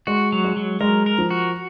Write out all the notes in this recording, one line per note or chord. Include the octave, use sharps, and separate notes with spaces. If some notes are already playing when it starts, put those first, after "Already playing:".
G#3 F#4
F#3
G#3
F#3
G#3 A#4
A#4
F3
F#4